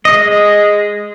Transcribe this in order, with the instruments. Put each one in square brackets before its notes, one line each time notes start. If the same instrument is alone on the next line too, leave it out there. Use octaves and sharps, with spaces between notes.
[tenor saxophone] G#3 [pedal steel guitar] D#5